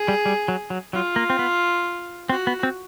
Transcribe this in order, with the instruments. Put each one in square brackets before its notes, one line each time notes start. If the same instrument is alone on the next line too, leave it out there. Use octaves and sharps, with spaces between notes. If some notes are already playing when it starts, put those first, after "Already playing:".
Already playing: [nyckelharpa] G#4
[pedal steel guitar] G3
G3
F#3
F#3
[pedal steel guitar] F#3 [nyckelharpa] F4
[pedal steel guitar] A#3
C4
B3
[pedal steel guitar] C4 [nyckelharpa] F#4
[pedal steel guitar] B3
C4